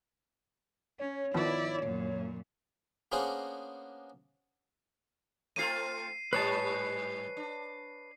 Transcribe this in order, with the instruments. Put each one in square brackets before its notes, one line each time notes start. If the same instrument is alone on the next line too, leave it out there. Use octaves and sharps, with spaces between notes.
[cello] C#4 [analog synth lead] C#5
[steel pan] D#3 F3 B3 [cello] E4 D5
[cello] F#2 A#2
[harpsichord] A#3 B3 C#4 D4 G#4 C5
[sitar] A3 C4 F4 [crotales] C7 D#7
[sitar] G#2 G3 [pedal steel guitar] B4 C#5 A5 [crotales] C7
[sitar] D4